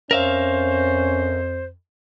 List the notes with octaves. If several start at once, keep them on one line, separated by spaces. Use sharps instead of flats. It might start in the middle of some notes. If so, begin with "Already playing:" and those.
F2 C#4 A#4 C5 E5 F5